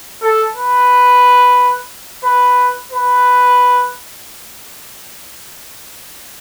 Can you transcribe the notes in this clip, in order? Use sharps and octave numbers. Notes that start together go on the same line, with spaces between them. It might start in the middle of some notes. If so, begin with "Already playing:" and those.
A4
B4
B4
B4